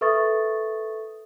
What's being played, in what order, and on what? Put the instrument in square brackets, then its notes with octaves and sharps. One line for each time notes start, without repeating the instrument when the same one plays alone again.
[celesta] A4 B4 E5 C#6 D#6 A6